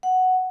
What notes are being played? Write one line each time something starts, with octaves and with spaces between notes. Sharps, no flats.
F#5